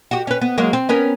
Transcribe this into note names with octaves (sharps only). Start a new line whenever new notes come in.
F#4 G4
C#4 B4
B3
F#3 G#3 A#3
C4
B3 C#4 A#4